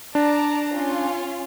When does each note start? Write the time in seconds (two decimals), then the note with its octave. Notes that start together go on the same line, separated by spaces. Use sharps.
0.15 D4 D5 A5 A#5
0.75 C#4 F4